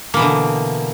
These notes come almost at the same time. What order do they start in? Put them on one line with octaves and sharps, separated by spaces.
A#3 E3 B2 D3